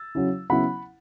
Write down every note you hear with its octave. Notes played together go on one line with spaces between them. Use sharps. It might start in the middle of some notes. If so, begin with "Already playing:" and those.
Already playing: E6 A6
C#3 F#3 C#4 E4
C#3 F#3 B3 E4 F#5 B5